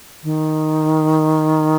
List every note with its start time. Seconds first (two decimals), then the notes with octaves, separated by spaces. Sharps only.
0.23 D#3